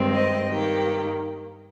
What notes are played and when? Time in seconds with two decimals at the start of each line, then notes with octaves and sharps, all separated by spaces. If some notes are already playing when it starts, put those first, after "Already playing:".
Already playing: G2 D#3 G#3 C4
0.14 C5 D#5
0.50 G2 D#3 A#3 G4